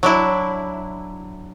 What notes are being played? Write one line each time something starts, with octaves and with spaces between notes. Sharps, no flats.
F#3 D4 E4